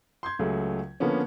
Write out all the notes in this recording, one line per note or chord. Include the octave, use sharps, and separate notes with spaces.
C6 G6 G#6
C#2 F#3 A3 G#4
D3 F3 A#3 B3 C#4